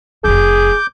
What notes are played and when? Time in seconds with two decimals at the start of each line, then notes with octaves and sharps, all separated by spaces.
0.24 F1 F2 G#4 D6 G6